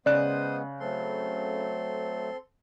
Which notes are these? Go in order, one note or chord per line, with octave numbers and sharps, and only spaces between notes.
C#3 G#3 B3 C5 D5 D#6 F#6
F#3 A3 C4 A4 C6